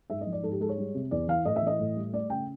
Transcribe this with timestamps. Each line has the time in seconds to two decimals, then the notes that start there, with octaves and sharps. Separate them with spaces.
0.10 G#2 E5
0.21 D#5
0.27 F3
0.32 D5
0.43 G#2 A4
0.52 G4
0.60 G#3 A4
0.69 C#5
0.78 G3
0.95 C3
1.11 E2 D5
1.28 E3 F5
1.45 A2 D#5
1.56 E5
1.62 E3 D#5
1.79 A2
1.96 G3
2.13 A3 D5
2.30 C#3 G5